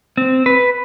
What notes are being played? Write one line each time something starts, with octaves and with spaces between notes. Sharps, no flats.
C4
B4